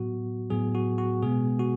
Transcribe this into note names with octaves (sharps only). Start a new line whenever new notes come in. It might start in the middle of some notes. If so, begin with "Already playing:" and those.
Already playing: A2 F#3 B3 F#4
A2 F#3 B3 G#4
F#4
F#4
B2 G#3 B3 G#4
F#4